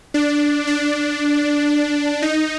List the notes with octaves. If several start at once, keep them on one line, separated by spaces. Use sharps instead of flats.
D4
D4
D#4